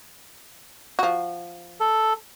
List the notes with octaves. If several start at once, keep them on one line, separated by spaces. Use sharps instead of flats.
F3 F#4
A4